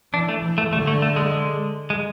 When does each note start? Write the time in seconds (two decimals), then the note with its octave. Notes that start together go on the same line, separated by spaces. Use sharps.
0.13 E3 D4
0.29 A3
0.43 E3
0.58 A3
0.72 D3 A3
0.87 A3
1.02 A3
1.16 G#3
1.31 G#3
1.90 G#3